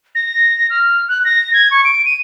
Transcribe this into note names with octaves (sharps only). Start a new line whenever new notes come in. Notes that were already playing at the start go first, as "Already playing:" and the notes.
A#6
F6
F#6
A#6
G#6
C#6
D7
D#7